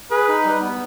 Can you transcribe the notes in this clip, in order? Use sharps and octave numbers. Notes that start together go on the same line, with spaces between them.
G#4 B4
D#4
G3
B3